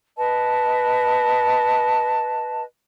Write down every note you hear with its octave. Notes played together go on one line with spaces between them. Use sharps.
B4 D#5 A5